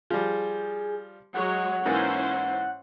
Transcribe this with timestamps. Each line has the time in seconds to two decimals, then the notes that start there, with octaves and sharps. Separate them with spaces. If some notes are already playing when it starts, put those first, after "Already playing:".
0.10 F3 G3 G#4
1.34 F#3 G#3 C#5 F#5
1.86 G#2 E3 A#3 C#4 E4 C5